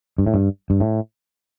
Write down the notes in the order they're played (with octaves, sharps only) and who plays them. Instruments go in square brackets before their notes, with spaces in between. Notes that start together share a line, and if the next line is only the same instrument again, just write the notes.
[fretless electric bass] G2
A2
G2
G2
A2